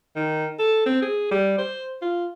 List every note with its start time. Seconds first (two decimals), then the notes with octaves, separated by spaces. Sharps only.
0.16 D#3
0.59 A4
0.86 C4
1.02 G#4
1.31 G3
1.58 C5
2.02 F4